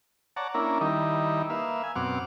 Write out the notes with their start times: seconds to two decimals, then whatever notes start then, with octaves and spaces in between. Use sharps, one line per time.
0.36 C#5 D5 F#5 A5 A#5
0.54 A#3 C#4 D4 E4 A#4
0.81 D#3 G3 D#4 E4
1.50 A#3 B4 E5 F5
1.83 G#5
1.96 F#2 B2 C4 F#5 D6 F6